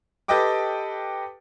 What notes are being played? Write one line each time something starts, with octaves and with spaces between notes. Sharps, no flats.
G4 A4 B4 D#5 G5 D6